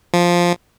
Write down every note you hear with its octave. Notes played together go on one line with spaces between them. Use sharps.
F3